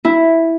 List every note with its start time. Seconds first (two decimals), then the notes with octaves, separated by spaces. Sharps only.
0.05 E4